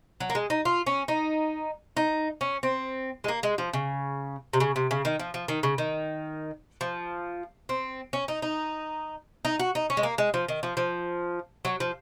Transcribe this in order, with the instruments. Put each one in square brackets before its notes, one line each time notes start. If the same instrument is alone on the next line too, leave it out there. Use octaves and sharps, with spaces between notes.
[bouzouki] F#3
A#3
G#3
D#4
F4
C#4
D#4
D#4
C#4
C4
G#3
A#3
G#3
F3
C#3
C3
C#3
C3
C#3
D#3
F3
F3
D#3
C#3
D#3
F3
C4
C#4
D#4
D#4
D#4
F#4
D#4
C#4
G#3
A#3
G#3
F3
D#3
F3
F3
F#3
F3